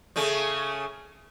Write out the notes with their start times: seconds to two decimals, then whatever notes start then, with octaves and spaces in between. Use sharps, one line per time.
0.16 C#3 A3 C#4